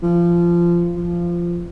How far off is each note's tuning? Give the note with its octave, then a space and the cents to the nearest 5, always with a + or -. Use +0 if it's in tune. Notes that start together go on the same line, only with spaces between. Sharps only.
F3 -20
F3 -15